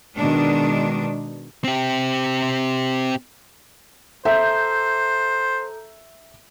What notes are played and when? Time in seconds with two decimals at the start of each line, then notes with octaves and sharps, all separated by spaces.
0.17 B2 D#3 G#3 D4
1.64 C4 G4
4.25 A4 C5 E5 A#5 G6